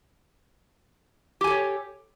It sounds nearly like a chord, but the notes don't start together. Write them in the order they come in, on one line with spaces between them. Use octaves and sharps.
G4 G#5 A4 C#5